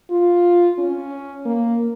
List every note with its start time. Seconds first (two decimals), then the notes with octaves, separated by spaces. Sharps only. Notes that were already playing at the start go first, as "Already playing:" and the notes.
0.11 F4
0.79 C#4
1.46 A#3